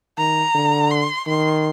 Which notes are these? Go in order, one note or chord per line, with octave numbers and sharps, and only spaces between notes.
D#3 A#5
D3
C6
D#3 C6